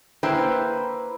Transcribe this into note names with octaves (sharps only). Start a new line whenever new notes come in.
A#3 E4 B4 C5 G5